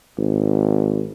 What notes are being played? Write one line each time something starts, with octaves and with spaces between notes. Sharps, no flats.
G#1